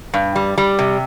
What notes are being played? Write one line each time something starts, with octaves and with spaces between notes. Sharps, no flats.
G2
G3
G3
C3